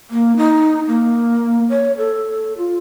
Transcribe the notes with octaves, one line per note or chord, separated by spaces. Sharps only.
A#3
D#4
A#3
C#5
A4
F4